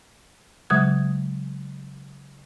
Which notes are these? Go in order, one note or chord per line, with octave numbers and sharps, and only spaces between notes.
C#3 F#3 G#3 D#6 G#6